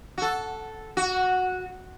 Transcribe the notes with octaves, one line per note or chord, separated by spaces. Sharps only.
F#4
A4
F#4